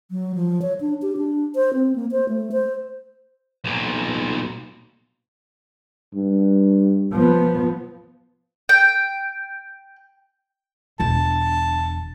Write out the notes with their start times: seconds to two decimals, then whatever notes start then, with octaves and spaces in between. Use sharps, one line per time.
0.11 F#3
0.35 F3
0.62 C#5
0.81 D4
1.02 G4
1.17 D4
1.55 C5
1.74 C4
1.96 A#3
2.11 C5
2.29 A3
2.52 C5
3.64 B1 A#2
6.15 G2
7.13 F3 B3
8.69 G5
11.00 E1 D3 A5